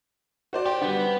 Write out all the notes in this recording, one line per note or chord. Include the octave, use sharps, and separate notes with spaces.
F#4 C5 D5
G4
D3 G3 B3